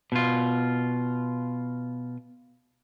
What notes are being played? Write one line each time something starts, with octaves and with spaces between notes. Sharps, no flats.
B2 F4